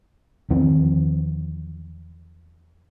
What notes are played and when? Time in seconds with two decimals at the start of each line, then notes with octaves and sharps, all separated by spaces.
0.50 E2 D#3 F3 C4